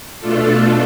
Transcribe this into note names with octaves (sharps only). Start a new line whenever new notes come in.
B2 A3 D4 F4 A4